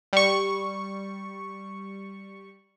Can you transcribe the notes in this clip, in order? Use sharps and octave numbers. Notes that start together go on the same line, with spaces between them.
G3 C#6